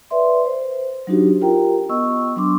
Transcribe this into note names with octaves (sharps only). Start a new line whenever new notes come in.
B4 D5 E5 C6
C5
F#3 D4 D#4 F#4 G4
F4 G4 A#4 G5 A#5
B3 D#5 C#6 E6
F#3 B3 D4 C6 D6